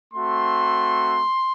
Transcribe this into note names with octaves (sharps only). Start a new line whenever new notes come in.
A3 C4 F#4 C6